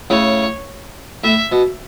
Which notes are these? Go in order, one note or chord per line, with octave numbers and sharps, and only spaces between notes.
A2 C#3 C#5
A2 E5
B2